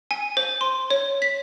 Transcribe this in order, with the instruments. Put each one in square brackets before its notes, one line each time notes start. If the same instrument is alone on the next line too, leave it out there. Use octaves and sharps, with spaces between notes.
[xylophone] G#5
C5
C6
C#5
B6